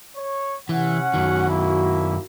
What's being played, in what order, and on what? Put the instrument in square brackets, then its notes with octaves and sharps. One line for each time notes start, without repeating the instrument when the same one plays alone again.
[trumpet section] C#5
[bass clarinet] C3 [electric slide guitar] E3 [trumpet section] C#4 F#5
[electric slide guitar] F#2 D#3 [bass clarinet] F#4
[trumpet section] A#3 E4